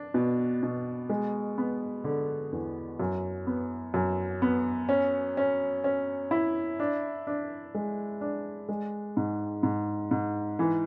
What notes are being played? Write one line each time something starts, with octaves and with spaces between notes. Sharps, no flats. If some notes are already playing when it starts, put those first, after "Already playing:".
Already playing: D4
B2
B2
G#3
B3
D3
E2
F#2
B3
F#2
B3
C#4
C#4
C#4
E4
D4
D4
G#3
D4
G#3
G#2
G#2
G#2
E3